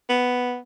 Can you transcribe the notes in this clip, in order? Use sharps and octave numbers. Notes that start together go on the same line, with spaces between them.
B3